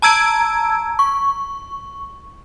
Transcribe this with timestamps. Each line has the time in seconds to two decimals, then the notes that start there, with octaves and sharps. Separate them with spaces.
0.02 A5 A#5 E6 G#6 D7
0.99 C#6